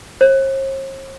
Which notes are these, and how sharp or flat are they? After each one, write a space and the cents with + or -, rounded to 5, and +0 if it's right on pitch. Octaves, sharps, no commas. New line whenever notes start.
C5 +45